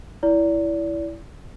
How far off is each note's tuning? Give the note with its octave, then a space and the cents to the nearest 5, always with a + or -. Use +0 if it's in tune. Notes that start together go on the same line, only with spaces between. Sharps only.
E4 +5 D5 -30